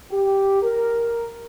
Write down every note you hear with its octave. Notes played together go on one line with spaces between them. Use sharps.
G4
A#4